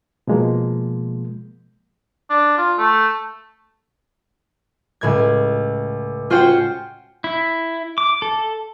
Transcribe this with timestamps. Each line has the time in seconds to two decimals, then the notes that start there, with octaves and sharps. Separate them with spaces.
0.27 B2 F3 G#3 A#3
2.30 D4
2.58 F4
2.78 A3
5.01 C#2 A2 G#6
6.30 C#4 F4 F#4 C5 F#5 G5
7.24 E4
7.98 D6
8.22 A4